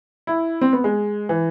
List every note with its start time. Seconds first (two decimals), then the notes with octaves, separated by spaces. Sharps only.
0.27 E4
0.61 C4
0.73 B3
0.84 G#3
1.29 E3